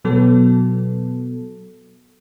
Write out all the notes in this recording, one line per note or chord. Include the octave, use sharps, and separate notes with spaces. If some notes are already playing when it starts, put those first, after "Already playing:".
B2 F#3 B3 A4